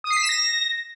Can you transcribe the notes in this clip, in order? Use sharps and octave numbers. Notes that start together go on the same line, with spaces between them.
D#6
C7
B6
E7
A#6